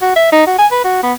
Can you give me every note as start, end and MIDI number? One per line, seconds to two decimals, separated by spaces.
0.02 0.16 66
0.16 0.32 76
0.32 0.45 63
0.47 0.55 66
0.59 0.66 80
0.72 0.84 71
0.84 1.03 66
1.03 1.13 59